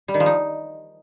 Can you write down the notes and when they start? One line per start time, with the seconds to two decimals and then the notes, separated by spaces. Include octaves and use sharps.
0.08 G3
0.14 D#3
0.20 F3
0.26 D#4